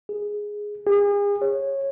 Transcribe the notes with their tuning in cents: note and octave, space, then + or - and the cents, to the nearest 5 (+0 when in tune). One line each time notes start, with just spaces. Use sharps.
G#4 +0
G#4 -40
C#5 -15